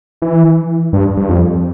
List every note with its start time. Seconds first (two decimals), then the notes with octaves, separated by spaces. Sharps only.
0.22 E3
0.93 G2
1.17 G2
1.29 F2